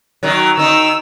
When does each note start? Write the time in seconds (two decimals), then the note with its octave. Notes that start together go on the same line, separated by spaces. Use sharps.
0.23 D#3 F#3
0.57 D#3 D#4 E6